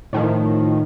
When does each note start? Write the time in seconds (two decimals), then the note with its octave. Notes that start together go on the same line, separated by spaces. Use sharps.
0.13 A2 D#3 F3